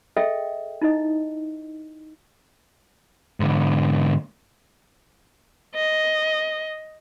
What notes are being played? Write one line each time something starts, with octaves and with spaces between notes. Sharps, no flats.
G#4 A4 D#5 E5 G5
D#4 E4 D#5
G#2 D3
D#5